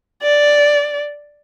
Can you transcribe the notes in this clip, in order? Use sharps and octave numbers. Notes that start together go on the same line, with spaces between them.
D5